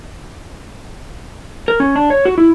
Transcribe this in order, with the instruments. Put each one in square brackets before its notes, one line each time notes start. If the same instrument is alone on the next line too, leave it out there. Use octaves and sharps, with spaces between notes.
[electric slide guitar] A#4
C#4
D4
C#5
F#4
E4